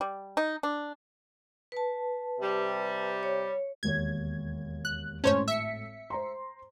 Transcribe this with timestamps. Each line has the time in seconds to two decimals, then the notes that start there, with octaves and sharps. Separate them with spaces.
0.01 G3
0.37 D#4
0.63 D4
1.72 B4 A5
2.40 C3 G3
3.23 C#5
3.83 E1 D#2 C#5 G#6
4.85 F#6
5.24 G#1 A2 C#4 C5 C#5 A5
5.48 E5 B6 C#7
6.10 C5 A#5 C6